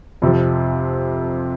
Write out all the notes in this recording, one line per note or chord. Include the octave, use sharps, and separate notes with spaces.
F2 C3 F3